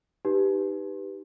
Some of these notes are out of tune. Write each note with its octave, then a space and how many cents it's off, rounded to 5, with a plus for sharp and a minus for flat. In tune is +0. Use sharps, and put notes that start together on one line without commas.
D#4 +0 G4 +0 B4 +0